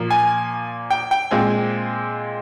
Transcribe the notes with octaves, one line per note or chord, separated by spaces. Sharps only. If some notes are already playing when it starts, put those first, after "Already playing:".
Already playing: A#2 F3 A#3
G#5
G5
G5
A#2 G#3 C4 G#5